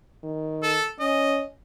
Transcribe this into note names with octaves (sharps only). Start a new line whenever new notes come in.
D#3
A4
C#4 D#5